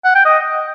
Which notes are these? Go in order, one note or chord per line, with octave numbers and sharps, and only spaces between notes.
F#5
G5
D#5